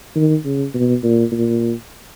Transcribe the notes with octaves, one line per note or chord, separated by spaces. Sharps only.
D#3
C#3
B2
A#2
A#2